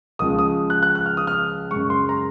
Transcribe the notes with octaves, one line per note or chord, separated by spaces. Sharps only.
C#2 C#3 F3 G#3 D#6
D#6
F#6
F#6
F#6
F6
D#6
F6
F#2 C#3 G#3 C#6
C6
A#5